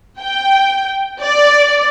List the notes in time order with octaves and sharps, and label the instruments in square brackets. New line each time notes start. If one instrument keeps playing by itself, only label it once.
[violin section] G5
D5